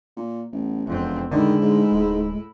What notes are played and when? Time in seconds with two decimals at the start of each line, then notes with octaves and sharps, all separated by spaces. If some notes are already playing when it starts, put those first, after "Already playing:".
0.17 A#2
0.52 A1 B3
0.86 E1 F2 B3 C4
1.31 A2 D3 D#3 G#3 E4
1.62 G#2
1.92 D1